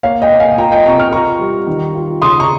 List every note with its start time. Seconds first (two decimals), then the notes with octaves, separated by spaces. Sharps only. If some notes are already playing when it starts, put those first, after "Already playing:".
0.03 A#3 C#5 F5
0.22 D#5 G5
0.31 A#3
0.40 F5 G#5
0.58 F4 G5 A#5
0.72 D#5 G5
0.85 C3 A#5 C#6
0.99 C#6 F6
1.13 F4 A#5 C#6
1.40 G3
1.67 D#3
1.95 F4
2.22 C#3 C6 D#6
2.40 A#5 C#6